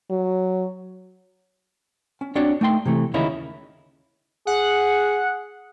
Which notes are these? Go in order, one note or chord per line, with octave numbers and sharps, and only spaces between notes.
F#3
C#4
C4 D4 F#4 C#5 D5
A3 D#4 G5 C6
C3 E3 A3
D#2 C#3 A#3 D#4 E4 C#5
G#4 F#5